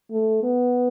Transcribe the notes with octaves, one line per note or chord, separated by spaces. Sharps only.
A3
B3